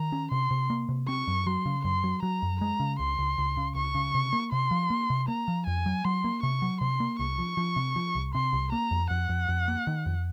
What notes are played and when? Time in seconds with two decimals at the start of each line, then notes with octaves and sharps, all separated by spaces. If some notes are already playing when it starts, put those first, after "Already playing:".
Already playing: D#3 A#5
0.12 C#4
0.32 C3 C6
0.51 C3
0.70 A#3
0.89 C3
1.08 C4 C#6
1.28 F#2
1.46 F#3 C6
1.66 C#3
1.84 F#2 C6
2.04 F#3
2.23 F#3 A#5
2.42 F#2
2.61 G#3 A#5
2.80 C#3
2.99 C#2 C6
3.19 C#2
3.38 C#2
3.57 C#3
3.75 C#2 C#6
3.95 C#3
4.14 C3
4.33 A#3
4.52 C3 C6
4.71 F3
4.90 A#3
5.10 C3
5.28 A#3 A#5
5.48 F3
5.67 F2 G#5
5.86 F#3
6.05 F#3 C6
6.24 A#3
6.43 C3 C#6
6.62 F#3
6.81 C3 C6
7.00 A#3
7.19 C2 C#6
7.38 F3
7.57 F3
7.76 C3
7.96 F3
8.15 C2
8.34 C3 C6
8.53 C2
8.72 A#3 A#5
8.91 F2
9.11 F2 F#5
9.29 F2
9.49 F2
9.68 A#3
9.87 D#3
10.06 F2